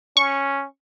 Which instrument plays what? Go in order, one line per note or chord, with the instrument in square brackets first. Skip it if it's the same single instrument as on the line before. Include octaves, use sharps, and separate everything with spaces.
[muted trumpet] C#4 [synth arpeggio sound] C#6